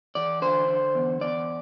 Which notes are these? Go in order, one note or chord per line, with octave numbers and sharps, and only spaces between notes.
E3 D5
D3 C5
D3
E2
E2 D5